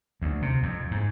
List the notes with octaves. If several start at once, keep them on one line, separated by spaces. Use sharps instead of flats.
D2
C3
F2
G#2